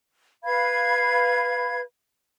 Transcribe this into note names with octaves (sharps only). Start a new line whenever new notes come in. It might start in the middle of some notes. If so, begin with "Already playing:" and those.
B4 F5 B5 G#6